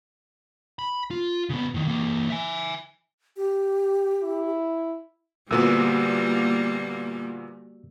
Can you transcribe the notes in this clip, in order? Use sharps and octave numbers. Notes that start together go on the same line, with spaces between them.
B5
F4
C#3 B3
A2 D#3
E3 A#3
E5 G#5
G4
E4
D2 A#2 G3 A#3 B3 F#4 A#4 E6